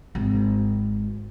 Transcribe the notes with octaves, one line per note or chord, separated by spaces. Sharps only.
G#1